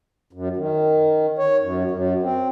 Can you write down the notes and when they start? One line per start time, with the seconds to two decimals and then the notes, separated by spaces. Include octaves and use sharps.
0.33 F#2
0.56 D#3
1.38 C#5
1.61 F#2
1.91 F#2
2.22 C4